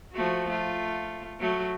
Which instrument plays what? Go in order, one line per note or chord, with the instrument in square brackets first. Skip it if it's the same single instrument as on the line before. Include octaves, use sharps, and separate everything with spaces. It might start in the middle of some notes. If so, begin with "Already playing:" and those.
[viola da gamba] F3 A3 F#4
A3 F4
F#3 A3